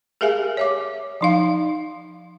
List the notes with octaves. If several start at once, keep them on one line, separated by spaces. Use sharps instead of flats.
G4 G#4 A#4 E5 F5 G#5
C#5 E5 D6
F3 D#4 F5